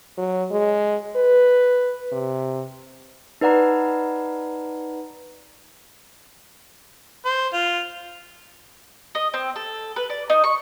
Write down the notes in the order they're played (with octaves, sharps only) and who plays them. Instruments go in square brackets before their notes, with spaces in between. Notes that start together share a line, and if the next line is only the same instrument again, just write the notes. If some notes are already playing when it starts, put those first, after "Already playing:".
[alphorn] F#3
G#3
B4
C3
[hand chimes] D#4 B4 D5 F#5 A#5 B5
[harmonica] C5
F4
[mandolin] D#5
C4
A4
B4
D5
D#4
C#6